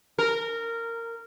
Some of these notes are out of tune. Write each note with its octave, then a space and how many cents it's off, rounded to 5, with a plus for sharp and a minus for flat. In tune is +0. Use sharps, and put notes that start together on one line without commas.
A#4 -15